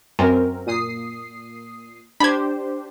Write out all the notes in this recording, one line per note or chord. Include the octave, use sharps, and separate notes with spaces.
F#2 C4 A#4
A#2 D#6 C7
D4 G4 C5 B5 G#6